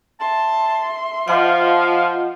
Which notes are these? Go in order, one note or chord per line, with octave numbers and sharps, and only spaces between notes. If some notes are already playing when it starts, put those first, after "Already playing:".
E5 A5 C6
F3 F4 D#5 F5 F#5